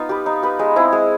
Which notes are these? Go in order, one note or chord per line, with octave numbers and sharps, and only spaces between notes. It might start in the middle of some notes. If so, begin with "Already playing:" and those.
Already playing: B3 D#4 F4
G4 B4
D#4
G4 B4
G#3
C4 E4 G#4
G#3